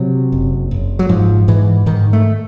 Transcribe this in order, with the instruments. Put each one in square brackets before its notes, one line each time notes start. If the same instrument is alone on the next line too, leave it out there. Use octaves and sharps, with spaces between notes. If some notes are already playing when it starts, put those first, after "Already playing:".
Already playing: [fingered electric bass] C3 F#3
F#1
F#1
F#3
G#2 F3
G#2 E3
G#2 D#3
A3